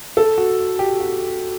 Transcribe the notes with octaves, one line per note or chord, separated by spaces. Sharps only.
A4
F#4
G4
F#4